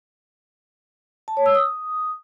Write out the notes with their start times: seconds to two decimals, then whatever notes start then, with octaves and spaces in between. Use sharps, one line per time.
1.28 A5
1.37 C#5
1.46 E6
1.55 D#6